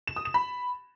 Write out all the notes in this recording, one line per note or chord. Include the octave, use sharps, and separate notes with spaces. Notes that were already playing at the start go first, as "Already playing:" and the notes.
E7
D#6
E7
B5